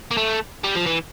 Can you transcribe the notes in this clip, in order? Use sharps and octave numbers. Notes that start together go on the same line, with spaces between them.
A#3
A3
G3
F3
E3